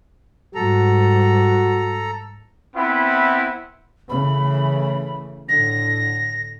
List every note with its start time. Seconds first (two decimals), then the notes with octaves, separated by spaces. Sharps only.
0.55 G#2 G3 F#4 A4 A#5
2.76 B3 C4 E4
4.09 C#3 E3 A3 B5
5.49 A2 D3 A#6